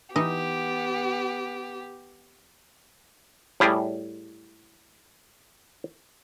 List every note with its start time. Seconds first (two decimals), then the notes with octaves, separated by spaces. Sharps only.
0.16 E3 B3 D#4 G4 D#5
3.60 A2 G3 G4 G#4